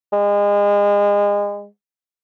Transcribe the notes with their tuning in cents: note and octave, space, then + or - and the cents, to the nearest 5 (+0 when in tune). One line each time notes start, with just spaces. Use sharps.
G#3 -30